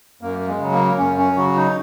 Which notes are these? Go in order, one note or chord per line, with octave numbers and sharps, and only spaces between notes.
F#2 A#3
A#3
G#3
C#3 F#3
A#3
F#2 C#4
C#4
C#3 F#3 F#4
D#4